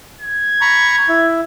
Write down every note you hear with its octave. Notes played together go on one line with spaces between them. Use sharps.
G#6
A#5 B5 C#6
E4